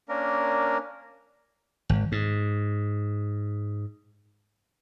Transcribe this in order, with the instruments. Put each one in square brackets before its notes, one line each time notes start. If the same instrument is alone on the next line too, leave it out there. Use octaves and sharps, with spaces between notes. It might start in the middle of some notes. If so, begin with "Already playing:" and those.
[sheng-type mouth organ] A#3 C#4 D4 A#4
[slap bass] G#1
G#2